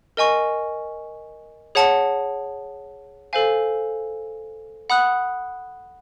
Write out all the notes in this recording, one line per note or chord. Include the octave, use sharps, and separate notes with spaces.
A#4 D#5 G#5 C#6
G#4 C#5 F#5 A5
A4 C5 F5 G#5
F#5 B5 D#6 F#6